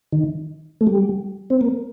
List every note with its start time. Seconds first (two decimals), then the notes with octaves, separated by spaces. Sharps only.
0.13 D#3
0.81 A3
0.87 G3
1.50 C4
1.61 A#3